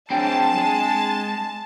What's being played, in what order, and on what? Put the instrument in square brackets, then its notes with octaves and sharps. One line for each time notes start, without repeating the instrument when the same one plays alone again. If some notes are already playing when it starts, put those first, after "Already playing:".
[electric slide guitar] F#3 G#4 C5 [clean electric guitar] C4 D4 G5 [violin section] A5
[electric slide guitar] G#3 G#4